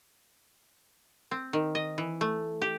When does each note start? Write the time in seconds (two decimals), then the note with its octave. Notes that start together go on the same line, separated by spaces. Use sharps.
1.31 C4
1.53 D#3
1.75 D#5
1.98 E3
2.21 A3
2.62 G4